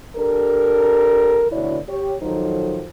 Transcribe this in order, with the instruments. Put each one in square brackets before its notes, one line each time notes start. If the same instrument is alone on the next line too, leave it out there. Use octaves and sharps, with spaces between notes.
[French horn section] D4 G4 A4 A#4
D2 B2 D3 E4 C#5 D5
G4 C#5
D#3 F3 F#3 D#4 A4 C5